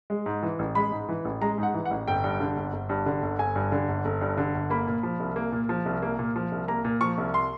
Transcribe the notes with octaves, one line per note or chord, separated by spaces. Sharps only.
G#3
G#2
E3
A1
G#3 B5
G#2
E3
A1
G#3 A#5
G#2
F#5
E3
F#5
A1
G1 G5
G2
D3
G1
G1
G2
D3
G1
G1 G#5
G2
D3
G1
G1
G2
D3
G1
A#3 B5
A#2
F3
C2
A#3
A#2
F3
C2
A#3
A#2
F3
C2
A#3 A#5
A#2
F3 C#6
C2
C6